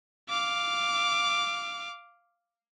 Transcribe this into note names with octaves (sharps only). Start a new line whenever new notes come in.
F5 D6